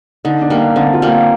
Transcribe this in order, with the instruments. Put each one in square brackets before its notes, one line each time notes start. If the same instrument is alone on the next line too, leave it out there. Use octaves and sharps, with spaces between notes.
[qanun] D3 [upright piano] D#4
[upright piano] D4
[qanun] G3 A#3
[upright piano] D4
[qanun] D3 [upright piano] C4
[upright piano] F4
[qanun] G3 A#3